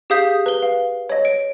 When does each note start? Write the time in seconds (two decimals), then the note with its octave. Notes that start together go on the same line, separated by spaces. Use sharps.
0.10 G4 G#4 F5 D#6 G6 B6
0.46 B4 G7
0.62 F5
1.10 C#5 D#5
1.25 D7